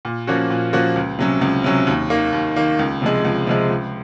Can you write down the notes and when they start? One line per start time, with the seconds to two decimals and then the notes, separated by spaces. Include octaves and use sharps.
0.05 A#2
0.27 F3 A#3 C#4 F#4
0.50 A#2
0.73 F3 A#3 C#4 F#4
0.96 C#2
1.19 C3 F#3 C#4
1.41 C#2
1.64 C3 F#3 C#4
1.87 D#2
2.10 D#3 A#3
2.33 D#2
2.56 D#3 A#3
2.79 C#2
3.02 C3 F3 G#3
3.25 C#2
3.47 C3 F3 G#3
3.70 C#2